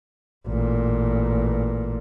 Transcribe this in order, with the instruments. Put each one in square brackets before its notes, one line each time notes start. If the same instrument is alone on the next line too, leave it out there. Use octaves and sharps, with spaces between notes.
[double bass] A1 A#2